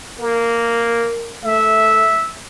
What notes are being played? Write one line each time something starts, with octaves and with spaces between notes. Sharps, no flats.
A#3 A#4
A3 E5